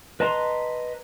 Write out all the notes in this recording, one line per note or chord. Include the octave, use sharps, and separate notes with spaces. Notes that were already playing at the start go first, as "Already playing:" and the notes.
B4 D#5 A5 A#5 C6